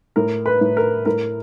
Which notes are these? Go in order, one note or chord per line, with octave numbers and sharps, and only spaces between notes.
A2 A#4
B4
A2
A#4
A2 A#4